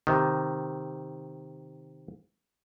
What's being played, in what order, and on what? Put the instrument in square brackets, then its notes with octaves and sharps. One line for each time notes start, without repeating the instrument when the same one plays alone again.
[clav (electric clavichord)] C3 D#3